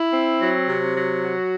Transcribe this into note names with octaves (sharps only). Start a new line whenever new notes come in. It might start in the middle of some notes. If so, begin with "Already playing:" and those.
Already playing: E4
C4
F#3
C3
F#3
F#4